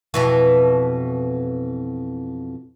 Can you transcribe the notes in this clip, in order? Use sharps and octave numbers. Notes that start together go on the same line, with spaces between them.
F2 B2 E3